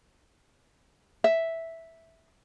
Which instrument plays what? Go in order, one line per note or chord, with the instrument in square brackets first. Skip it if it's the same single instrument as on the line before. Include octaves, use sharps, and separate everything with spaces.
[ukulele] E5